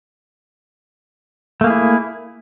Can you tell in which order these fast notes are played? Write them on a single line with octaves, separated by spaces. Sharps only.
A3 A#3 G#4 E4